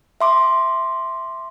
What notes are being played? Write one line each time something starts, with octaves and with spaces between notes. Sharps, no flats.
E5 C6 D6